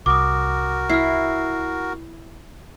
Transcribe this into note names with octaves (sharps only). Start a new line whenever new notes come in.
C2 F#4 A#4 D6 D#6
E4 F6 C7